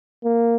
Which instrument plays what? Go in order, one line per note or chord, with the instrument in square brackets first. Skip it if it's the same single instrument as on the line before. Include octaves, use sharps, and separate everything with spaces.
[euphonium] A#3